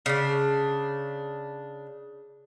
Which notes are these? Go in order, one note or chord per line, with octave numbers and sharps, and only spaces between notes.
C#3 D4